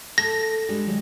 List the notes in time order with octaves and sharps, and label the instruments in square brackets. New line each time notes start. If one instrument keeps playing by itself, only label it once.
[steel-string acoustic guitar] A4 [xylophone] A#6
[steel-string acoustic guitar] G3 G#3 D4
D#3 F#3 G#3